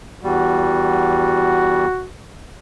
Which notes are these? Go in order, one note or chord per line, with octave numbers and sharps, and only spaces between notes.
E2 G3 F#4